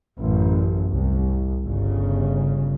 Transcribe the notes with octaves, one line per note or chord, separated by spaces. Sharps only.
A1 F#2
C2
G1 C#3